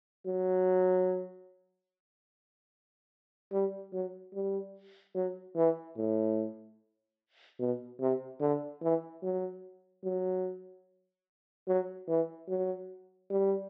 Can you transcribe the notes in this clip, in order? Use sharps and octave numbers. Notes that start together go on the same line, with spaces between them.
F#3
G3
F#3
G3
F#3
E3
A2
B2
C3
D3
E3
F#3
F#3
F#3
E3
F#3
G3